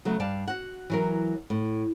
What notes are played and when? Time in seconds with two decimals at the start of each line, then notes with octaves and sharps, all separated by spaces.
0.05 C#3 F#3 A3 B3
0.20 G2 D5 F5 A5
0.48 F#4 F#5
0.90 E3 F#3 A#4
1.50 A2